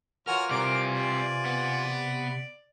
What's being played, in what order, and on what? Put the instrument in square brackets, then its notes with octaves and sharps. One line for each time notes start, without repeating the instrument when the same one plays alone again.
[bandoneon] E3 F4 G#5 [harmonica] F#4 C#5 F6 [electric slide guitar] A#4
[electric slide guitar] C3 [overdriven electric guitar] G3 C4 [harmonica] A#4 D6
[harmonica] D5
[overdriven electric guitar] B3